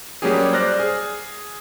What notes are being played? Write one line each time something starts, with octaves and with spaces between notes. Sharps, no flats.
F#3 G3 A#3 C#4 G4 G#4
C5 D5 F6 F#6 A#6
G#4